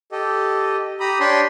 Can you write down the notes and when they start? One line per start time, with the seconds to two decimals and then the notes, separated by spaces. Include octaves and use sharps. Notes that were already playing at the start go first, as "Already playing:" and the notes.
0.12 G4 A4 D#5
1.00 G4 A#5 B5 D#6
1.20 D4 C#5 G5 A5 B5 C6